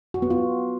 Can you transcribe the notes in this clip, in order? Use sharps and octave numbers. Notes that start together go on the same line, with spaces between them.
F#4
B3
F4